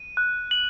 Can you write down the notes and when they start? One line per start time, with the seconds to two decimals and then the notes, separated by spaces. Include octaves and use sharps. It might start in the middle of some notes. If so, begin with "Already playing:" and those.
Already playing: D#7
0.17 F#6
0.51 F#7